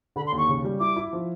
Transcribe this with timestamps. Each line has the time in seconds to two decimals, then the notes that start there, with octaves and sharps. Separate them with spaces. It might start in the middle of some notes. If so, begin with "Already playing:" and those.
0.16 D3 B5
0.27 C6
0.32 D#2
0.38 C#6
0.48 C#3
0.64 G3
0.80 E4 D6
0.96 E4
1.13 F3